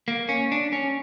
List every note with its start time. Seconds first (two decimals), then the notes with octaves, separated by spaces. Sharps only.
0.08 A#3
0.29 C#4
0.52 D4
0.73 C#4